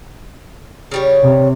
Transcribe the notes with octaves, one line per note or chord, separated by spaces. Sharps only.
C#3 G3 C#5
C3